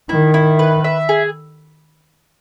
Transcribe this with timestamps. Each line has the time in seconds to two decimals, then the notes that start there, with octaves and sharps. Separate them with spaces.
0.09 D#3 E4
0.34 E4
0.59 B4
0.84 E5
1.09 G#4